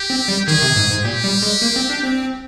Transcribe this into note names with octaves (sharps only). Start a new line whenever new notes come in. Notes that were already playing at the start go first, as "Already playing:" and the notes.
Already playing: G4
C4
G3
D#3 G#4
C3
G#2
G#2
A#2 G4
G3
G#3
A#3
C4
D4
C4